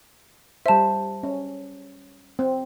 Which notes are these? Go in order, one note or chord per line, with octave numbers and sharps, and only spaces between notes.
G3 C5 E5 A5
C#4
C4